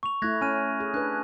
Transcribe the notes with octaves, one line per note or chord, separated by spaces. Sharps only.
C#6 F7
A3 E4 F#6 G#6 A#6
C#4 G#5 F6 D#7
G#4
D4 B4 F#6